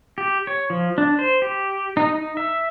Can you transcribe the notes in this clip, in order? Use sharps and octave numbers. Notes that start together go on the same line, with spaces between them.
G4
C#5
F3
D4
C5
G4
D#4
D#4
E5